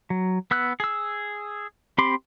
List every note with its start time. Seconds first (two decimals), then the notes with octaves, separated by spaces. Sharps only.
0.10 F#3
0.51 B3 E6 F#6
0.80 G#4 E6
1.98 C4 G4 B5 C6 D6